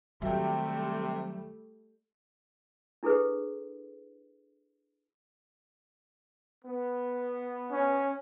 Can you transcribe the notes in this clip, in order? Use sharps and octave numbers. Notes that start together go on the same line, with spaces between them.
C3 D#3 F#3 G3 A3 E5 G5
D4 E4 G#4 A4 B4
B3
C#4